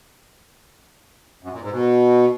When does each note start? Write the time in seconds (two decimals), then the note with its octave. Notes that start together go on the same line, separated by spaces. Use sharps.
1.43 F#2
1.52 A#2
1.61 G#2
1.71 B2